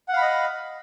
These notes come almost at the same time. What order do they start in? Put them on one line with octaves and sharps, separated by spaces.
F#5 F5 B5 D#5